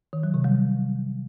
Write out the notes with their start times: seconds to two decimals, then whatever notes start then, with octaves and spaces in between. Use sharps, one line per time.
0.13 D#3
0.23 F#3
0.34 C3
0.44 G3